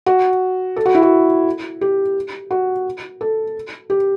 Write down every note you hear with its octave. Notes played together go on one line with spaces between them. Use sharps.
F#4
A4
F#4
E4
F#4
G4
F#4
A4
G4